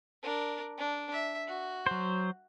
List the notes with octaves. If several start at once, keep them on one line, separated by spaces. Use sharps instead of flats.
D4 A#4
D4
E5
F#4
F#3 C5